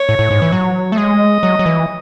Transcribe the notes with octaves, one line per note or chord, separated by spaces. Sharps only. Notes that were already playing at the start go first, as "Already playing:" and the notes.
Already playing: C#5
A2
A2
G#2
E3
F#3
A3
G#3 D#5
F#3
F#3
E3